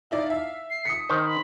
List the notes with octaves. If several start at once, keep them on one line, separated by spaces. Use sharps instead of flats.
D#4 E4 D5 F5
E5
C7
D#6 B6 C#7
D#3 C5 G6
B5